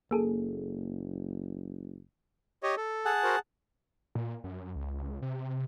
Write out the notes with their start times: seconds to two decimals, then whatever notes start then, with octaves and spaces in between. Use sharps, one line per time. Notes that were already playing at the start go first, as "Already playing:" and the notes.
0.11 F#1 A#3 G#4 A4
2.63 G4 C#5 D#5
2.77 A4
3.05 G#4 F#5 A5
3.23 F#4 A#4 C5
4.15 A#2
4.44 F#2
4.75 C#2
5.22 C3